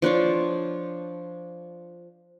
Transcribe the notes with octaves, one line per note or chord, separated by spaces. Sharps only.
F3 D4 C5 C#5